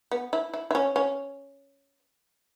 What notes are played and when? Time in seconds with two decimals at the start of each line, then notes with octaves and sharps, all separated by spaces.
0.11 B3
0.33 E4
0.54 E4
0.71 E4
0.75 C#4
0.96 C#4